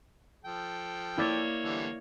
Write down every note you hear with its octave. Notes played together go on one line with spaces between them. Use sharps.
F3 A4 G5
A#3 E4 C#5 D5 A6
D3 E3 G3